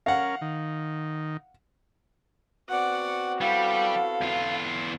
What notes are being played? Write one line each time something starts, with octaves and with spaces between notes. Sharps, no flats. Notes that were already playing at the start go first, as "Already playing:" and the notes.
C#4 A#4 F5 F#5
D#3
B3 C4 F#4 D5 F#5
G3 E4 A4 F5
E2 F4